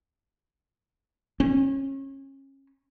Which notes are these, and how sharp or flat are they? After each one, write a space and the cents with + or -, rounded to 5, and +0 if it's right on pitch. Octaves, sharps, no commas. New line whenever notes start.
C#4 -30